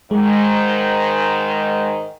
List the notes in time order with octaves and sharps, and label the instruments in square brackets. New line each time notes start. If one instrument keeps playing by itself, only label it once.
[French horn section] G#2 D#3 [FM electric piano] G#3